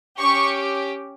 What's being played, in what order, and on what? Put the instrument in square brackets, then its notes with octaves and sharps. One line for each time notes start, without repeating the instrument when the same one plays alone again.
[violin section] C#4 G4 C#6